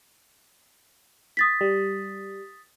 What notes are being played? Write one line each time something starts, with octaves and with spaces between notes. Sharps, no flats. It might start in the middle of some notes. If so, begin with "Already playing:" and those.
D#6 A6 B6
G3